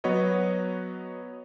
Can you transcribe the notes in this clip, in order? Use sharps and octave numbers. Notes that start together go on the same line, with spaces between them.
F#3 B3 F#4 B4 C#5 D#5